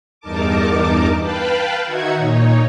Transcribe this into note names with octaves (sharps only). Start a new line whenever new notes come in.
E2 G2 D#4 A#4 A5 D6
B4 F5 G5 A5 B5
D#3 D#4 F#4 E5 F#5 G#6
A#2 D#4 C#5